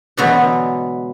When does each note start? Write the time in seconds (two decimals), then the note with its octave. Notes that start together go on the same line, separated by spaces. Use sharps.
0.17 B2 D3 E3 F#3 G#3 B3